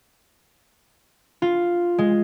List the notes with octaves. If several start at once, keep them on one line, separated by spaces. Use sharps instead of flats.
F4
G#3